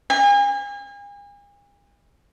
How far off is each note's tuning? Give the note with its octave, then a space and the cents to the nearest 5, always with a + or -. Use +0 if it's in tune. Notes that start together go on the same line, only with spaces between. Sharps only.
G#5 -40